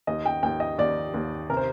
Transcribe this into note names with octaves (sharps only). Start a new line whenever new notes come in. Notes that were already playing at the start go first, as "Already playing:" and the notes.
D#2 D#5
G5
D#2 G5
D#5
D#2 D5
D#2
C3 A#4
C5